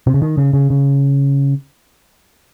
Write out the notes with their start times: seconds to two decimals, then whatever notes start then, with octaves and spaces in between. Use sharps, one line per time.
0.07 C3
0.14 C#3
0.22 D#3
0.38 C#3
0.53 C#3
0.70 C#3